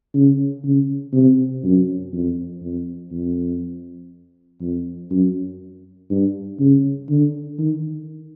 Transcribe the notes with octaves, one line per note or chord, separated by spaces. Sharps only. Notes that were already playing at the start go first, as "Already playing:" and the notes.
C#3
C#3
C3
F#2
F2
F2
F2
F2
F#2
G2
C#3
D3
D#3